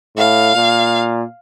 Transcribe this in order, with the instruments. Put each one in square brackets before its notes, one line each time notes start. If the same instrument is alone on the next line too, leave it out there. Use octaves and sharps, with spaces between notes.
[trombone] A2 [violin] F5
[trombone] A#2